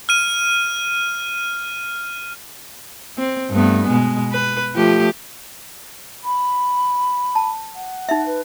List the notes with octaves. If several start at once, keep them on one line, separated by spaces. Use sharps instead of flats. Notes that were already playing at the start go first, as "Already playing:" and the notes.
F6 D#7
C4
G2 A3 B3
B2 G#3
B4
F3 A3 G4
B5
A5
F#5
D#4 E5
B4